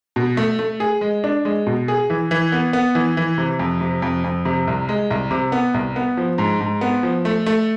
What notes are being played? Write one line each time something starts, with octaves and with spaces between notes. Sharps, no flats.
B2
A3
A3
G#4
G#3
D4
G#3
B2
G#4
E3
E3
B3
B3
E3
E3
C3
F2
C3
F2
F2
C3
C2
G#3
C2
C3
B3
C2
B3
F3
G#2
G#2
B3
F3
A3
A3